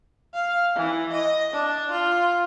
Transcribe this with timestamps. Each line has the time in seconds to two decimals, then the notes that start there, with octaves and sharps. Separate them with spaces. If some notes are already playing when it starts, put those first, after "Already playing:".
0.34 F5
0.76 E3
1.12 D#5
1.53 D4
1.91 F4